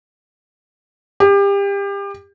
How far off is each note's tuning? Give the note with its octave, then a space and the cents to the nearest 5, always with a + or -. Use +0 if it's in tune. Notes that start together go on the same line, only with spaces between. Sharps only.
G4 +30